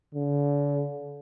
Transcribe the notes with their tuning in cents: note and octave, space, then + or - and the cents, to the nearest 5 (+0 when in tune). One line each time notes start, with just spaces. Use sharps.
D3 -40